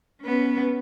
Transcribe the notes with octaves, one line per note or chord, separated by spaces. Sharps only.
B3 C#4